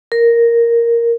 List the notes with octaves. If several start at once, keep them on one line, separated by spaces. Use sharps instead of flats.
A#4